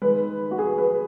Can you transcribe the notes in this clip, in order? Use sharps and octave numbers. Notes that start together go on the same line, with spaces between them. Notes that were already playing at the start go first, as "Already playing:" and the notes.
D#3 G#3 B4
F#4
G#4
B4